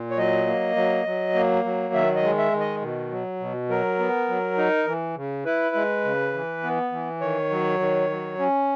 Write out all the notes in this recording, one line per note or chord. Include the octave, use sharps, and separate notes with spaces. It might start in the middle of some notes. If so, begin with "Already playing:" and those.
Already playing: A#2
C#5
F#3 D#5
A#3
F#3
F#3
A#3
F#3
D#3 E5
D#5
G#3
E5
D#3
D#5
B2
F#3
B2
F#3 A#4
B3
F#3
D#4
E3
C#3
E4 B4
G#3
C#3
E3
B3
E3
D#3 C#5
F#3
D#3
F#3
C#4